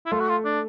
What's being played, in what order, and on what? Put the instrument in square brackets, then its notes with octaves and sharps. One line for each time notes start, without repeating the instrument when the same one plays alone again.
[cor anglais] E4
[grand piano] A3 A4 [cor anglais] F4
[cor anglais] F#4
F4
D4